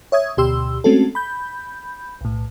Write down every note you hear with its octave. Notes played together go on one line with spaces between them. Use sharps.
C#5 E5 D#6 G#6
D2 B2 G4 C6 E6
G#3 A3 C4 C#4 F#4 A4
B5 G6
B1 A2